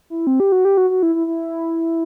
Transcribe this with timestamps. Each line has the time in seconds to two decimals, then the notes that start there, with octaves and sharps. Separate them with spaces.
0.10 E4
0.27 C4
0.40 G4
0.52 F#4
0.65 G4
0.77 F#4
0.90 F#4
1.03 E4
1.15 E4
1.27 E4